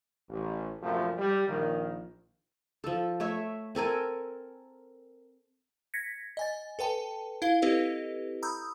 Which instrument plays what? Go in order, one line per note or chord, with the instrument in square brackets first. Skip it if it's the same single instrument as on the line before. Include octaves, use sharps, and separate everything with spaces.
[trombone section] A1
A#1 F#2 C3 F3 A3 G4
G3
A#1 D#3
[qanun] F3 A4
A3 C#5 E5
C4 A4 A#4 G#5
[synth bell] G#6 A#6 B6 C#7
D#5 G#5 A6
A4 B4 G5 A5
E4 F5 G7
C4 E4 G4 A4 B4 D#5
A#5 B5 D#6 E6 G6